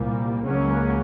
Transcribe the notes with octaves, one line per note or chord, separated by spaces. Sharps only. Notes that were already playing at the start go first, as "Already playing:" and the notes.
Already playing: C2 A#2 G3 A#3
C#2 C#3 F#3 A#3 C#4